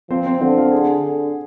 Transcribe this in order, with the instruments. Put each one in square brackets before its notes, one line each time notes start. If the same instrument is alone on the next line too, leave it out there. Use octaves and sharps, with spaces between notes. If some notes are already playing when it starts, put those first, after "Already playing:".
[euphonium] F3 [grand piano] C4 C5
[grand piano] C4 C5
[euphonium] D3 [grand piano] C4 C5
[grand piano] F4 F5
G#4 G#5
[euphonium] D3